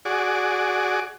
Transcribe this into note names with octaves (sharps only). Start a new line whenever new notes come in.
F#4 G#4 D5